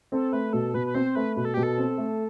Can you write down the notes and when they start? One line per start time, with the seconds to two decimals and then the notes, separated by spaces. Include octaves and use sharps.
0.12 C4 A4
0.32 A3 B4
0.53 B2 A4
0.74 B2 B4
0.86 B4
0.95 C4 C5
1.15 A3 B4
1.36 B2 B4
1.45 A4
1.54 B2 G4
1.63 A4
1.78 C4
1.98 A3